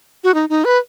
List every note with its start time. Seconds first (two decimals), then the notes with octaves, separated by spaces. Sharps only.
0.24 F#4
0.34 D#4
0.49 D#4
0.65 B4